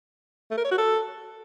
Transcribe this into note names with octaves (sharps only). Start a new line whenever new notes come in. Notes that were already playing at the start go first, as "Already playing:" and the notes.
A3
A#4
C#5
F#4
A4